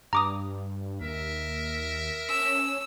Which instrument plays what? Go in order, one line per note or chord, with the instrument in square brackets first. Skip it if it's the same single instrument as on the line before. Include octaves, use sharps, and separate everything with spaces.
[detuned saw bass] G2 [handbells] A#5 D6 D#6
[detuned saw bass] D#2 [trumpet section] A#4 E5
[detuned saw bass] C#4 [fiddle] E6